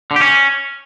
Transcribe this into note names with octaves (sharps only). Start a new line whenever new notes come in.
D3
G4
C#4